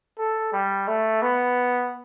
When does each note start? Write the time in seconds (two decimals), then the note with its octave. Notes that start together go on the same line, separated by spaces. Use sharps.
0.18 A4
0.52 G3
0.87 A3
1.22 B3